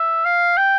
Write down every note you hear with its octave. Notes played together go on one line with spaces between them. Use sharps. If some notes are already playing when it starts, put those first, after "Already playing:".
Already playing: E5
F5
G5